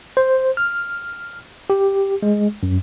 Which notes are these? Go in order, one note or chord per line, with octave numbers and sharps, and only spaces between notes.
C5
F6
G4
G#3
F#2